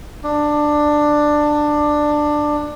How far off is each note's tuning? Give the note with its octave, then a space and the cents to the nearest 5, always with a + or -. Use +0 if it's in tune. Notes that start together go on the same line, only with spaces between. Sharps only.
D4 +15